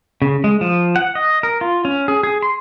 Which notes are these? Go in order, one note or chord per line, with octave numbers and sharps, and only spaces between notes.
C#3
G#3
F3
F#5
D#5
A#4
F4
C#4
G#4
G#4
C6